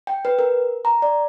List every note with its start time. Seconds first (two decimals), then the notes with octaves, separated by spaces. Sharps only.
0.07 G5
0.25 B4
0.39 A#4
0.85 A#5
1.02 D5